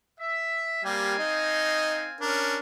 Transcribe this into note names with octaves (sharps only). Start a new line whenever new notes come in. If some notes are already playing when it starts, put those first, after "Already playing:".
E5
G3 A#3 C4 G4 F5 G#5
D#4 D#5
C#4 D4 A#4